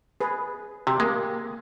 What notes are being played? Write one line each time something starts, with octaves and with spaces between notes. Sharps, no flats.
G#4 B4
C3 G4
G#3 A#3